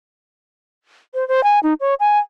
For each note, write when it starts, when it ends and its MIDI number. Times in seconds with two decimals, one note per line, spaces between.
1.14 1.27 72
1.28 1.44 72
1.44 1.59 80
1.63 1.74 63
1.80 1.94 73
2.00 2.19 80